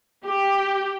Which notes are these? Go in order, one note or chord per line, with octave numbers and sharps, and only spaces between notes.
G4